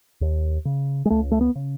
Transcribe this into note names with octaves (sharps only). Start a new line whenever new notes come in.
D#2
C#3
G#3
C#2 A3
A3
B3
C#3